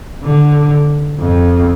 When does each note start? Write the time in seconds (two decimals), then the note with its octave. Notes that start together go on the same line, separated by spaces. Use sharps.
0.24 D3
1.20 F2